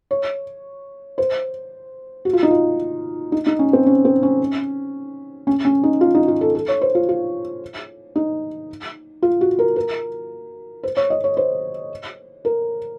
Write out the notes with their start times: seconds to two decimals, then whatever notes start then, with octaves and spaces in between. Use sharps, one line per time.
0.11 C#5
1.18 C5
2.25 F#4
2.33 F4
2.43 D#4
2.51 F4
3.32 D#4
3.47 D#4
3.59 C#4
3.73 C4
3.86 C#4
4.05 C4
4.23 C#4
5.47 C#4
5.65 C#4
5.83 D#4
6.01 F4
6.15 D#4
6.28 F4
6.41 A4
6.55 A4
6.68 C#5
6.81 C5
6.95 F4
7.09 F4
8.16 D#4
9.22 F4
9.41 F#4
9.59 A#4
9.76 A#4
10.83 C5
10.97 C#5
11.10 D#5
11.24 C#5
11.37 C5
12.45 A#4